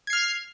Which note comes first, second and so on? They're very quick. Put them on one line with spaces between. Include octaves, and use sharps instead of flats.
G#6 C7 F6